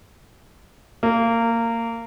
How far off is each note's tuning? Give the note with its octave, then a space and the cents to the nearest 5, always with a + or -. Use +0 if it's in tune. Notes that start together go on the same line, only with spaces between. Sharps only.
A#3 -20